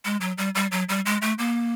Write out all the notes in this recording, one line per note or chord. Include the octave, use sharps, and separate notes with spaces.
G#3
F#3
G3
G3
F#3
G3
G#3
A3
A#3